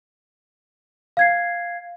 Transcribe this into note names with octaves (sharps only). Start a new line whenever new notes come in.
F5 G#6 C7